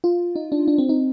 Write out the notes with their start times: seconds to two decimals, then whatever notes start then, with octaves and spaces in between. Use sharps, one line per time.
0.04 F4
0.36 D#4
0.52 D4
0.68 D4
0.78 C4
0.89 D#4